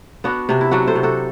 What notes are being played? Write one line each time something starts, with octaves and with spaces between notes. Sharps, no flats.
B3 D4 F#4
C3 D4
E4
F#3 D4 F#4
A4 C5
C3
F#4 A4